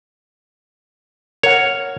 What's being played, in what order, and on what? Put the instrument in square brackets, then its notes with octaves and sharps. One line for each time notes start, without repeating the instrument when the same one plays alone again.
[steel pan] A#4 F#5 [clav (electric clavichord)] C#5